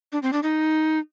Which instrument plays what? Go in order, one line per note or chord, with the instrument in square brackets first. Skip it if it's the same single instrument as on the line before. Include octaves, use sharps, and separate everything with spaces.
[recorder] D4
C4
D4
D#4